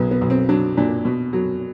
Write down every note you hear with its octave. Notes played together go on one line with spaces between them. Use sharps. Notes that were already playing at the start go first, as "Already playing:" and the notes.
Already playing: B1 C#3 B3
B3
B1
C4
F#3 D4
A#2 D4
B2
F#3